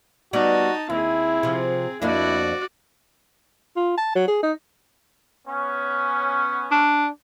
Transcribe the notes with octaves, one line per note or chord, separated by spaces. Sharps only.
G3 B3 D#4 F#4 A5
D#2 C4 E4 G#4
C3 F3
F2 A#3 D4 E4 F#4 D5
F4
A5
F#3
G#4
D#4
B3 C#4
D4